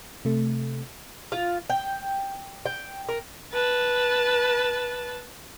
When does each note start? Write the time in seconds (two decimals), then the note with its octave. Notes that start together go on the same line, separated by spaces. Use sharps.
0.25 C3 A3
1.32 F4
1.70 G5
2.66 G5
3.09 A#4
3.53 B4 A5